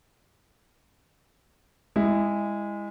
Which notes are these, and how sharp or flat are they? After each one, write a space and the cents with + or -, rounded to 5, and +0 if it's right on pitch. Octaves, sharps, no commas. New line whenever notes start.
G#3 -20 E4 +0